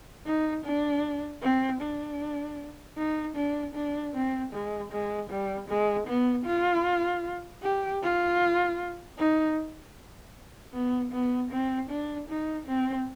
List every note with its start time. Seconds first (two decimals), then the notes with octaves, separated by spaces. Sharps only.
0.26 D#4
0.65 D4
1.42 C4
1.81 D4
2.98 D#4
3.36 D4
3.75 D4
4.14 C4
4.53 G#3
4.92 G#3
5.30 G3
5.69 G#3
6.08 B3
6.46 F4
7.63 G4
8.02 F4
9.18 D#4
10.74 B3
11.12 B3
11.51 C4
11.90 D4
12.29 D#4
12.67 C4